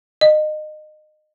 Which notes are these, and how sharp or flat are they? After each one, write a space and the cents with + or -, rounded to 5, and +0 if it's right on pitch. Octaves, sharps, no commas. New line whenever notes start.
D#5 -25